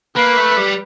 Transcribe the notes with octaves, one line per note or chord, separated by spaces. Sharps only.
A#3 B4
A3
G3